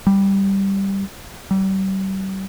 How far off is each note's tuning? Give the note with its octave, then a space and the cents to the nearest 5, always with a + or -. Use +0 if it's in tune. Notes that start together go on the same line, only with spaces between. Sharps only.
G3 +0
G3 -35